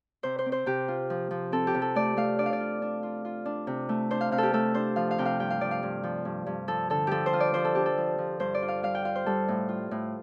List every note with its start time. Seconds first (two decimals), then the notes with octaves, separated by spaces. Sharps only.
0.23 C3 C5
0.39 C5
0.46 C4
0.52 C5
0.66 C3 G4
0.88 F4
1.10 F3
1.31 F3
1.52 C4 A4
1.67 G4
1.74 C3
1.82 A4
1.95 A3 D5
2.17 A3 F5
2.39 D4 D5
2.46 F5
2.53 D5
2.60 F4
2.82 D4
3.03 F4
3.25 F4
3.45 D4
3.67 C3
3.89 A3
4.11 D4 C5
4.21 F5
4.32 C3 F5
4.38 G4 A4
4.53 A3 A4
4.74 D4 C5
4.96 F3 F5
5.11 F5
5.18 C3 G5
5.25 F5
5.40 G2 G5
5.50 F5
5.61 F3 D5
5.71 F5
5.83 G2
6.04 F3
6.25 G2
6.46 G2
6.68 F3 A4
6.90 D3 A4
7.07 F3 G4 A4
7.26 C5
7.33 F4
7.40 D5
7.54 F3 C5
7.65 A4
7.75 D4 G4
7.86 A4
7.98 F3
8.18 F3
8.40 G2 C5
8.54 D5
8.62 F4
8.68 F5
8.83 G3 F5
8.95 G5
9.04 F4 F5
9.15 C5
9.26 G3 A4
9.48 A2
9.69 F4
9.91 A2